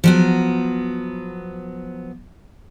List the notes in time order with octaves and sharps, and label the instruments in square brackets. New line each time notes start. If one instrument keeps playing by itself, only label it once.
[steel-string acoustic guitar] F3 F#3 B3